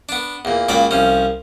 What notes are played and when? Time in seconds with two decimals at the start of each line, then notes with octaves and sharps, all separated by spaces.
0.09 B3 D4
0.45 E2 A#2
0.69 C#2 A#2 F#3 D5 B5
0.91 C2 F3 C#4